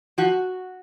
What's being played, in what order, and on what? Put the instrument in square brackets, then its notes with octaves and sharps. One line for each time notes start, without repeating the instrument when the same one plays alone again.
[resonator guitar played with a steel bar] F3 F#4